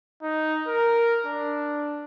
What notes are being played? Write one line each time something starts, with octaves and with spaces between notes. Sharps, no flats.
D#4
A#4
D4